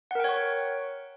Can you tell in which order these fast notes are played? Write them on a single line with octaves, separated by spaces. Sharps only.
F#5 A#4 G5 C#5 C#6